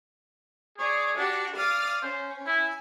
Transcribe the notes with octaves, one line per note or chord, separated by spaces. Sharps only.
G#4 C#5 D5
D4 F#4 G4 F#5
D5 F5 D#6 F6
C#4 C5
E4 G#5